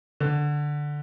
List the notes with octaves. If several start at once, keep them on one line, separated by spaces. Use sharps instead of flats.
D3